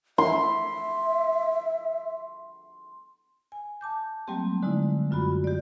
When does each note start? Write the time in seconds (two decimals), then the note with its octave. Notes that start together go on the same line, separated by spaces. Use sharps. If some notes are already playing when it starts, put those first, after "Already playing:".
0.18 E5 C6
3.52 G#5
3.81 A5 D6 G6
4.28 F#3 G3 A3 A#3 C4 G4
4.63 D3 G#3 D#4 E4
5.11 F#2 F4 F#4 B5
5.44 G4 D5